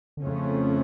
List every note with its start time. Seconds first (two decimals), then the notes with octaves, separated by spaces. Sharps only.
0.17 D3
0.22 F2 C#3 F3 A3 C#4